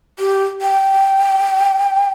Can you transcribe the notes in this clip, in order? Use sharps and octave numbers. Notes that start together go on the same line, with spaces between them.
G4
G5